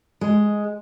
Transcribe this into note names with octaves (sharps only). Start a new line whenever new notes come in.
G#3